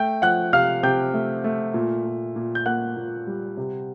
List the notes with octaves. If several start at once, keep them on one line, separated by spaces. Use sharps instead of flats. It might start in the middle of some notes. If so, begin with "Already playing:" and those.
Already playing: A3 G5 G6
F3 F#5 F#6
C3 F5 F6
C3 G5 G6
A3
A3
A#2
A#2
A#2
G6
A#3 F#5 F#6
A#2
G3
C3